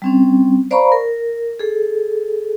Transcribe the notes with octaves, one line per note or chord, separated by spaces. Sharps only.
G3 C4 C#4
C5 D5 F5 A#5 B5 C#6
A#4
G#4 A4